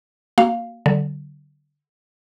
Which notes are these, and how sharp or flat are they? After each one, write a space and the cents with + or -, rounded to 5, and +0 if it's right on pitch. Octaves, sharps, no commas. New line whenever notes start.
A#3 +0 F#4 +5 F5 +0
D3 +0 F#3 +45